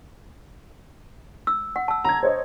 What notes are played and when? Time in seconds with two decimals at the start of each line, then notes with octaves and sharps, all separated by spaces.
1.47 E6
1.76 F#5
1.88 A5 E6
2.04 A#5 G#6
2.23 C5 C#5 D#5